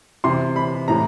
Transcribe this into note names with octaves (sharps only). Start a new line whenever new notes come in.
C3 E3 C6
B5
A2 E3 A#5